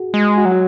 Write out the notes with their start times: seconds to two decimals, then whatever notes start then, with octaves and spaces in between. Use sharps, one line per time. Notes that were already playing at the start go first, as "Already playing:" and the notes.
Already playing: F#4 G#4
0.14 G#3
0.38 F#4
0.45 F#3
0.52 F#4